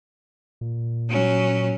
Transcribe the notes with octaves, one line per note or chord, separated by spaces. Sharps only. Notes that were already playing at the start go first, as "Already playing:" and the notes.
A#2
F#3 C#4